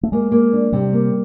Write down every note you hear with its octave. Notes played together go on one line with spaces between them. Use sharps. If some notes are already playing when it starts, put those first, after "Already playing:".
A3
G#3 A#3
A#3
D4
C3 G3
A#3